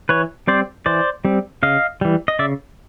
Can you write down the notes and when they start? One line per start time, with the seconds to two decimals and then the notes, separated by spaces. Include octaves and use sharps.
0.09 E3 B4 C#5
0.48 G3 C4 C5 D5
0.86 E3 C5 D5
1.25 G3 C4
1.63 C#3 D#5 F5
2.01 E3 G3
2.28 D#5
2.39 C#3 D5 E5